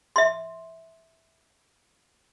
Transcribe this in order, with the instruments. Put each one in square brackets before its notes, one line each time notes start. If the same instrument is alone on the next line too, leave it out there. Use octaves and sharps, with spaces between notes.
[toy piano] E5 C6